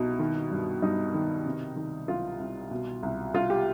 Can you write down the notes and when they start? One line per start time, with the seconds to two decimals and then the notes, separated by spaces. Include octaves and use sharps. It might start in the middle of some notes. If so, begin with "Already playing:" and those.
Already playing: C2 B2 D#4
0.19 D#3
0.51 G2
0.82 G2 D#4
1.14 D#3
1.46 C3
1.76 D#3
2.08 C2 F4
2.40 C2
2.71 B2
3.03 C2
3.34 C2 F4
3.50 G4